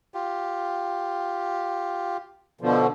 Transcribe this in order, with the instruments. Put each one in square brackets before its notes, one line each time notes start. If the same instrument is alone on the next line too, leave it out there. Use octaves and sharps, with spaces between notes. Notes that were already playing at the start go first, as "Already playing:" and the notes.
[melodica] F4 G4
[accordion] B2 D3 F3